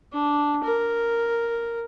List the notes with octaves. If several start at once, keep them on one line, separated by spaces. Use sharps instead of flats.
D4
A#4